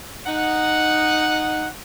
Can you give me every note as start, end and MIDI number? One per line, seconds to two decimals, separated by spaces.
0.26 1.67 63
0.26 1.67 78